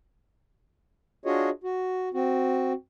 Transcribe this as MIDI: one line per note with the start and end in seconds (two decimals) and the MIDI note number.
1.26 1.50 62
1.26 1.50 65
1.26 1.50 66
1.26 1.50 68
1.26 1.50 73
1.26 1.50 75
1.64 2.09 66
2.14 2.73 60
2.14 2.73 66